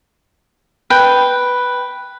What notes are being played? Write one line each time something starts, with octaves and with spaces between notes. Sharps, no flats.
B4 G5